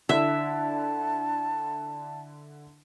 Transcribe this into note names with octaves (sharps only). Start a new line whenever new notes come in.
D3 D4 E4 E5 A5